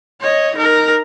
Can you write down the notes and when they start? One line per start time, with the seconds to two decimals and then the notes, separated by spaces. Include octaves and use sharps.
0.21 C#5 D#5
0.56 D#4 A#4